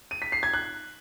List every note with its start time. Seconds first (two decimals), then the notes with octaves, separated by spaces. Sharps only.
0.11 D#7
0.22 B6
0.32 C7
0.43 G#6
0.54 F#6